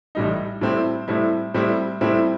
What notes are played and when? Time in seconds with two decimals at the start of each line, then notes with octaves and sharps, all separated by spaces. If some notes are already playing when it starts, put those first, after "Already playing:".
0.15 A1 A2 G3 D#4
0.61 A2 G3 C4 E4
1.08 A2 G3 C4 E4
1.54 A2 G3 C4 E4
2.01 A2 G3 C4 E4